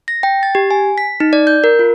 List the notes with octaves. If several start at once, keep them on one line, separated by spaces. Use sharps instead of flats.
A#6
G5
A6
G4
G#5
B6
D#4
D5
G6
A#4
F4